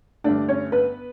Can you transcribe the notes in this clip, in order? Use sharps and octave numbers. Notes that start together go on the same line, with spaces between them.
G2 D3 A3 D4 D5
C#4 C#5
B3 B4